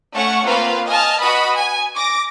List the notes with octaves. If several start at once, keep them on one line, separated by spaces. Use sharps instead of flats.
A3 C#4 F#5 C#6
A#3 C4 F4 B4 F5
D#5 G#5 A5 F6
F#4 B4 D#5 B5 D#6
G#5
D6 A#6